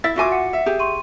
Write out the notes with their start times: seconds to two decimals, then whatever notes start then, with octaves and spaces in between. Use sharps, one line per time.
0.04 E4 E5 A6
0.16 F4 F#4 E5 G#5 C6 D6
0.32 F#5 C#7
0.53 E5
0.66 G4 G#4
0.79 C6 C#6 D#7